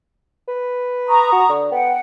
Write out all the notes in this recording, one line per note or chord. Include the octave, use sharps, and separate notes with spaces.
B4
A#5 C#6 D#6
F#4
D3
B3 F#5 G5